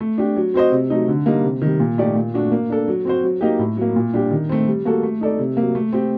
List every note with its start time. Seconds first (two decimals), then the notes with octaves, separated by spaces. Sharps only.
0.01 A3
0.18 D4 G4
0.36 F#3
0.54 C4 F#4 C5 D#5
0.72 C3
0.90 F#3 A3 D#4
1.08 D3
1.26 G3 A#3 D#4
1.44 C3
1.61 D#3 G3
1.80 A#2
1.98 A3 D#4 G4 D5
2.15 A#2
2.34 A3 D4 F#4
2.52 A#3
2.70 D4 A4
2.88 F#3
3.05 C4 F#4 C5
3.23 F#3
3.41 A#3 D#4 G4
3.59 A2
3.77 F#3 A#3
3.96 A#2
4.13 G3 D4 G4
4.31 D#3
4.49 A3 C4
4.67 G3
4.85 A#3 F#4 A4
5.03 A3
5.21 D#4 A4 D5
5.39 C3
5.57 F#3 A#3
5.75 A3
5.93 C4 G4